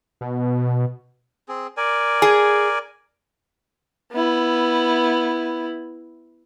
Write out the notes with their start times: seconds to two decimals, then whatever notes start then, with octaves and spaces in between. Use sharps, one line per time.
0.21 B2
1.48 C4 G#4
1.77 A#4 D5 G#5
2.22 G#4
4.12 B3 E4